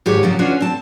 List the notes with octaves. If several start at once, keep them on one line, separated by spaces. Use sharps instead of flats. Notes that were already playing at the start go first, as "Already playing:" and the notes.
G#2 D#3 G4 G#4 C#5
C#3 F3 F#3
C#4 D4 F4 F#4 B4 C#5
C4 A5